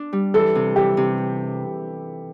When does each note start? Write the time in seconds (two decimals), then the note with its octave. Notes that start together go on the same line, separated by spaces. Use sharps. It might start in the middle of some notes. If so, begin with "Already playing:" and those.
Already playing: D4
0.13 G3
0.34 E3 A4
0.55 C3
0.76 E3 G4
0.97 C3